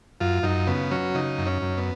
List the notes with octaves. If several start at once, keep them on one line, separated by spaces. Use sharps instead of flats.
F#2 F4
F#2 D#4
C#3 B3
F#3 C#4
C#3 D#4
F#2
C#4
F#2
B3